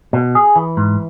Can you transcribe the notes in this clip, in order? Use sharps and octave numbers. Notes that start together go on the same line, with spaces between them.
B2
G#4
E3
G#2